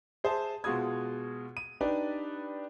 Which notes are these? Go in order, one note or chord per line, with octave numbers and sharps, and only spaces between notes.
G#4 C5 E5 A5
B2 G#3 F4 F#4 D#6 G#6
D#7
D4 D#4 G4 B4 D5